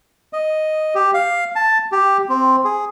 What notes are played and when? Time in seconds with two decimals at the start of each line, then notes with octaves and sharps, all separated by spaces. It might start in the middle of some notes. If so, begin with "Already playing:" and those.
0.33 D#5
0.95 G4
1.14 F5
1.56 A5
1.92 G4
2.29 C4
2.65 G#4